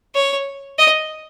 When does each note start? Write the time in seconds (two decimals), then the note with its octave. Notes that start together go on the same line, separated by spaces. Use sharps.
0.15 C#5
0.79 D#5